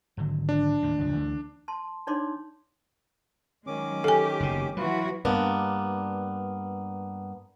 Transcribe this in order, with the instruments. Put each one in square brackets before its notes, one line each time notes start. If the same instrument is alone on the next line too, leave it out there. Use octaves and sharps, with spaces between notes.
[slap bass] G#1 D3 F#3
[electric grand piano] D4
[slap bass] D#2 A2 C3
G1 C#2 F3
D2 E3 A3
[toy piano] A5 C6
D4 D#4 C#5 D5 C6 D6
[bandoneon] D#3 C#4 D6 [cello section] F#3 G#3
[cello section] G4 [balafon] A4 G#5
[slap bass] F#1 B2
[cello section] E3 F#4 [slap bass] F#3 [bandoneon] F4 B4
[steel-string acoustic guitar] G2 A#3 B3 D4